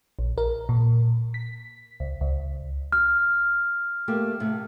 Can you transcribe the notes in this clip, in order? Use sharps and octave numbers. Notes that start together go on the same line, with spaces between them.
A#1
A#4
A#2
B6
C#2
C#2
F6
A3 A#3 G4
A2 C3